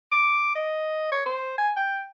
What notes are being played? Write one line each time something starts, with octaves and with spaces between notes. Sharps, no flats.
D6
D#5
C#5
C5
G#5
G5